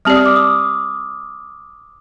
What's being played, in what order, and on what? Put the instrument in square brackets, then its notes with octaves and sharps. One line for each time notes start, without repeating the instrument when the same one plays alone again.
[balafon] G3 C4 G4 D5 [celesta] F6
[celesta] D#6
D6
D#6